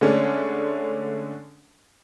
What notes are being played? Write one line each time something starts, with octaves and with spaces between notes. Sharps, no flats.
D3 G#3 A3 C#4 D4